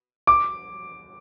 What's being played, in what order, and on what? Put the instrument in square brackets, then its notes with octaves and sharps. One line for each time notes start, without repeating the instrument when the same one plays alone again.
[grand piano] D6